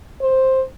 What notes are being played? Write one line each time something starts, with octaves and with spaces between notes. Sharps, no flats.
C5